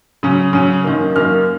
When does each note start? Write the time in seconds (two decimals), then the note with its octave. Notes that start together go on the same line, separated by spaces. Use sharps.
0.23 C#3 F#3 C#4
0.53 C#3 F#3 C#4
0.84 F#2 D#3 A#3
1.15 F#2 D#3 A#3 F6